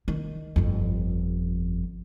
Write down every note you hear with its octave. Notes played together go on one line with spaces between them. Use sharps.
D#3
G1 F2